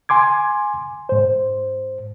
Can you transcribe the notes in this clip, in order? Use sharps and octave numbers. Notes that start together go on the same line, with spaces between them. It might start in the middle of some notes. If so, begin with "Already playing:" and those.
G#5 C6 D6 G#6
G#2 C5